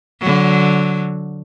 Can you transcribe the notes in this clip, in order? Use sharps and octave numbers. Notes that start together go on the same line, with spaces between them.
D3 F#3